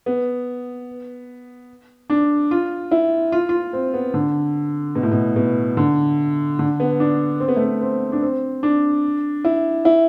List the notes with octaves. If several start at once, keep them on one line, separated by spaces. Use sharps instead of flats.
B3
D4
F4
E4
F4
F4
C4
B3
D3
B2
A2
B2
B2
D3
D3
B3
D4
C4
B3
A3
B3
C4
D4
C4
D4
E4
E4